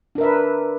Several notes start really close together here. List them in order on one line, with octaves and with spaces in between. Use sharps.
D4 A#4 E5 B4